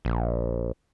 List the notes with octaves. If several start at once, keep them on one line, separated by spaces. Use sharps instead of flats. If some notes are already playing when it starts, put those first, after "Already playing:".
A#1